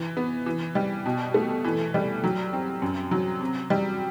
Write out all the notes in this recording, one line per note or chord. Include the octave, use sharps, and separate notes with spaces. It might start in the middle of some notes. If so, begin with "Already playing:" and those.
Already playing: E3
B3
E3
G3
B2
A3
E3
G3
F#3
C4
F#2
F#3
C3
G3